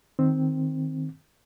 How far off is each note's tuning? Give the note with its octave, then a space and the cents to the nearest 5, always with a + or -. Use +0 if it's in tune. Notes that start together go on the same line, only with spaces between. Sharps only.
D#3 +0 C4 +0